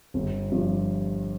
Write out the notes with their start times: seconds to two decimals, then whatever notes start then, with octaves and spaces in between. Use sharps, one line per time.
0.14 G1
0.52 G2 F3